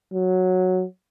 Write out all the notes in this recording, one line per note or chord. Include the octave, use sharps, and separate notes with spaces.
F#3